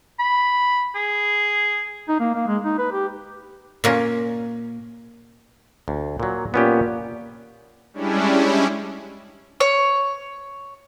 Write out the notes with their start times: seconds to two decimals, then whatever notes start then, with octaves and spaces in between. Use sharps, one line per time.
0.19 B5
0.95 G#4
2.09 D#4
2.20 A#3
2.35 A#3
2.47 G#3
2.64 D#4
2.78 B4
2.92 G4
3.84 A#2 A#3 C#4
5.88 D2
6.20 A#2 F#3
6.54 A#2 B3 C#4 G4
7.93 G3 G#3 C#4 D4 E4
9.60 C#5